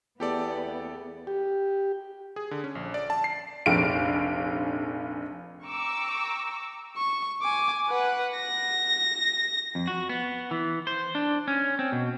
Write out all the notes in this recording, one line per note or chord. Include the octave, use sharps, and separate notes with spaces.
E2 B3 G4 A4 D5
G4
G#4
D3
C#4
A#1
D5
A5
C7
F1 A#1 F5 D7
G5 A#5 C#6 D6 E6
C#6
G#5 D6
B4 F#5
A#6
F2
F#4
B3
E3
C5
D4
C#4
C4
B2